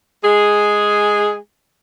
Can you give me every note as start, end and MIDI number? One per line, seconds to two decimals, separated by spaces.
0.25 1.35 56
0.25 1.35 68